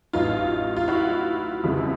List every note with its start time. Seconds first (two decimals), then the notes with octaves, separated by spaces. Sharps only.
0.13 A1 A2 F#3 D#4 F4
0.76 F4
0.88 E4 F#4
1.63 F#1 F2 C#3 E3 G3